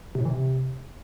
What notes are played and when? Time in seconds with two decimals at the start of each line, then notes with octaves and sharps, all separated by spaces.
0.15 C3
0.20 A2
0.25 E3
0.30 C3